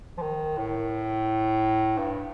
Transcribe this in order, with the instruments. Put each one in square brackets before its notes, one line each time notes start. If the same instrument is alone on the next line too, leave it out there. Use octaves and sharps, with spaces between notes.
[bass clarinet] F3
D#3
A2
G2